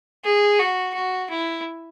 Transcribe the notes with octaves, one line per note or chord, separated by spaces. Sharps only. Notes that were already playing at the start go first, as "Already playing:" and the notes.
G#4
F#4
F#4
E4